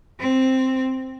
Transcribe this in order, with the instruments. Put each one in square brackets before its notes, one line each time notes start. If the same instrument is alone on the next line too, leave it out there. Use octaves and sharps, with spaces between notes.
[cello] C4